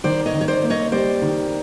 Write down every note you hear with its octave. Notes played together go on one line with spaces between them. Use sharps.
D#3 C5 D5
C#5 D#5
D#3
C#5
C5 D5
A#3
C#5 D#5
G3 C5 D5
D#3